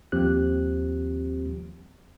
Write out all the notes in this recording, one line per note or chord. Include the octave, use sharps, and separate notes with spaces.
D#2 F3 C4 G4 F#6